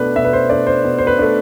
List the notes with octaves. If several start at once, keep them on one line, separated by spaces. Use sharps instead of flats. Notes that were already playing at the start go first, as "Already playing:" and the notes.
Already playing: B2 A3 D4 B4
B2 E5
B4
C5
A3 D4 D5
C5
B2
C5
B4
A3 D4